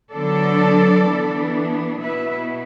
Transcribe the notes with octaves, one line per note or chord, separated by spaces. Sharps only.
D3 F#3 B3 D4 A4 D5
E3 B3 D4
B2 B3 E4 B4 E5